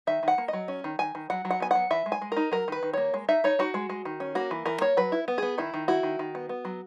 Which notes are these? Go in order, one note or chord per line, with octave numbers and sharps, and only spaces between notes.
D#3 E5
D#3 F#5
A#3
F#3 D#5
C#4
D#3
D#3 G#5
D#3
F#3 F#5
F#3
F#5
B3 G#5
F#3 F#5
E3 E5
G#3
G#5
G#3
D#4 A#4
F#3 A#4
D#3 B4
D#3
A#3 C#5
G#3
D#4 E5
D#4 C#5
D#4 F#4
G#3
G#3
D#3
C#4
A#3 F#4
E3
E3 A#4
A#3 C#5
F#3 B4
E4
B3
B3 G#4
D#3 E4
D#3
E4 F#4
D#3
D#3
B3
B3
F#3